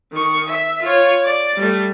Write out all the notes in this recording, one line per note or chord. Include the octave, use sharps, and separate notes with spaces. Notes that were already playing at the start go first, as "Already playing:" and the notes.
D#3 C#6
E5
F4 C#5
D5
G3 A3